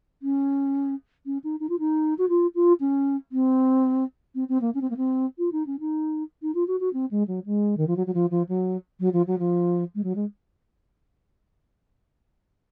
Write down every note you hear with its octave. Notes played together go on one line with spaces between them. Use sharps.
C#4
C#4
D#4
D#4
F4
D#4
F#4
F4
F4
C#4
C4
C4
C4
A#3
C#4
C4
A#3
C4
F4
D#4
C#4
D#4
D#4
F4
F#4
F#4
C4
G#3
F#3
G#3
D#3
F3
F#3
F#3
F3
F3
F#3
F#3
F3
F#3
F3
G#3
F#3
G#3